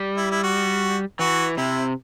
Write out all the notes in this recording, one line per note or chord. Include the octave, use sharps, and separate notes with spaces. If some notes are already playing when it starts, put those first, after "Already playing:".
Already playing: G3
E4
E4
F#4
E3 F#4
C3 E4